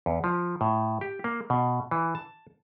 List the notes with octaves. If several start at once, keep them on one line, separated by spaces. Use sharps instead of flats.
E2
F3
A2
G4
A#3
B2
E3
A5